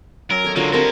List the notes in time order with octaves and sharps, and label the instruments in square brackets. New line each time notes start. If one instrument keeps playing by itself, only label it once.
[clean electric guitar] F#2 [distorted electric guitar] A#4
[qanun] A4 C#5 D#5
[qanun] D3 F#3 F4 [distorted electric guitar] G#3 A#3
[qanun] G3 C4 A5 [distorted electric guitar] A#3 D#4 [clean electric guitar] A#4